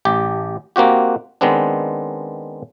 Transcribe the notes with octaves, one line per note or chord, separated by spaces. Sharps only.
A1 G4
A#3 C4 F#4 G4
D#3 G#3 B3 C4 D4